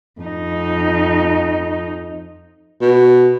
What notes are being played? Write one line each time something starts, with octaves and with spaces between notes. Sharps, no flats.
F2 D#4
B2